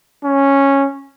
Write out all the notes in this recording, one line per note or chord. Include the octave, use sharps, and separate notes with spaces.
C#4